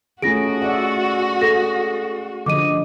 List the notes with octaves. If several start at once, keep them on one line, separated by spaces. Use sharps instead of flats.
A3 C#4 F4 F#4 G#4 A#6 D7
D5 E5 F#5
G#4 A4 A#6
D3 F3 D#5 D6 D#7